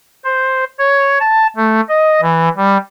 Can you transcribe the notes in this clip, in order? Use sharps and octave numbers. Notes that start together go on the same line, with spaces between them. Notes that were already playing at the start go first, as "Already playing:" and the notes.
C5
C#5
A5
A3
D#5
E3
G3